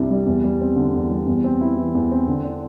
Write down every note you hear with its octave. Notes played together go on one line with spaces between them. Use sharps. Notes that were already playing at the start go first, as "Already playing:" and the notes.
Already playing: C2 C3 G3 D4
G3
E2
G3
C4
D3
E2
G3
E2
C4
E4
E3
E2
C4
D3
D4